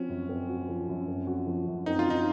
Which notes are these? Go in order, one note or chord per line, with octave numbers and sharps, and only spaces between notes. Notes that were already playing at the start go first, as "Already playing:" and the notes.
Already playing: F3 C4 C#4 F#4
F#2
C4
F#4
F3
F#2
C4
F#4
F3
F#2
C4 D#4
F4
D#4 F#4